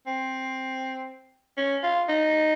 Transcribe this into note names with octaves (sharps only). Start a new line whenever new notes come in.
C4
C#4
F4
D#4